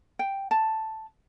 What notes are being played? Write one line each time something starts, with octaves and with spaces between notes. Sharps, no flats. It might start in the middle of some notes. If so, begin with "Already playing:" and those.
G5
A5